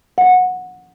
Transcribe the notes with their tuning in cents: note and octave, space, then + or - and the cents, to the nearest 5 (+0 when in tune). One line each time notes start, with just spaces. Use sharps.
F#5 -15